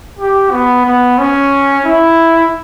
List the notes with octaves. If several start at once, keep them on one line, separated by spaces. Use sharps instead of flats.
G4
B3
B3
C#4
E4